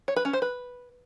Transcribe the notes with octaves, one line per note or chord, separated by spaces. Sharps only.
C#5
B4
C#4
C5
B4